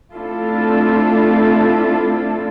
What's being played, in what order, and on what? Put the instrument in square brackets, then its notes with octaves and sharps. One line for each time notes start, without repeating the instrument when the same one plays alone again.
[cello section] A3 C4 D4 E4 F4 A4